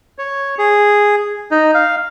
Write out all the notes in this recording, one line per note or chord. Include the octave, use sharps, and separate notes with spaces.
C#5
G#4
D#4
F5